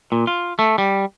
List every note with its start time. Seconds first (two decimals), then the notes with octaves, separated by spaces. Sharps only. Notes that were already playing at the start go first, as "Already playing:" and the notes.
0.12 A#2
0.27 F4
0.59 A3
0.78 G3